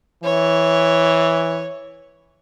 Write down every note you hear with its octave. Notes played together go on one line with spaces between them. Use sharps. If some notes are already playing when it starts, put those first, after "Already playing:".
E3 C#5